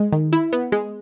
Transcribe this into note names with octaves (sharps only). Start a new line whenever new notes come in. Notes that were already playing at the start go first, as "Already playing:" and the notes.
Already playing: G#3
D#3
E4
B3
G#3